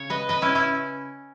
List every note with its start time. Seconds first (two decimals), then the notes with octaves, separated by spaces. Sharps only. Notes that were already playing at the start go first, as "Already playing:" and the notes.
Already playing: C#3 C#5
0.10 B4 D#5
0.29 B4 D#5
0.42 C#4 E4
0.55 C#4 E4